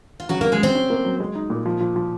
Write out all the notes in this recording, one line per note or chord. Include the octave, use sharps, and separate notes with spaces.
F4
C#3 F#3 F#4
F#3 A#3 A#4
G#3 G#4
C#3 C4 C5
C#4
A#3
F#3
G#3
D#4
A#2
F3
F3
F3